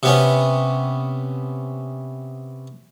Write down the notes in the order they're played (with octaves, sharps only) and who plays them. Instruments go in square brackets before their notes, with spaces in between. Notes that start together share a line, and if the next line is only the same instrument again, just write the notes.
[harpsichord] C3 B3 C#4